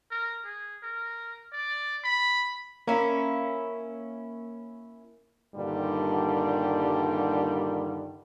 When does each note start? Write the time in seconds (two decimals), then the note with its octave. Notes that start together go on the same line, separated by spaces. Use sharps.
0.11 A#4
0.45 G#4
0.83 A#4
1.53 D5
2.04 B5
2.87 A#3 C#4 E4
5.55 G2 A#2 D3 D#3 G3